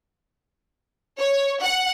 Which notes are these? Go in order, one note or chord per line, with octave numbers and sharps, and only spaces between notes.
C#5
F#5